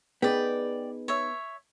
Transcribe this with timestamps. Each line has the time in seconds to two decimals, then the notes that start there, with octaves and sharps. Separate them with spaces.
0.22 B3 D#4 G#4 B4 D5 G5
1.08 C#5 E5